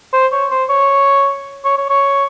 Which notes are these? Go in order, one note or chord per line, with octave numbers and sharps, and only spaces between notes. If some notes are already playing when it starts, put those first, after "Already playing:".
C5
C#5
C5
C#5
C#5
C#5
C#5